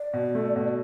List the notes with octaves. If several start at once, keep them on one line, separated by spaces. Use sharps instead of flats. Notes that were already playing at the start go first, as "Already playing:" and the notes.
Already playing: D5
B2
A3
B2